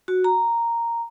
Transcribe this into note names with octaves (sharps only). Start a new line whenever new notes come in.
F#4
A#5